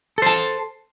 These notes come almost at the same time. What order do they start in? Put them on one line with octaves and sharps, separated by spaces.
A4 C5 A5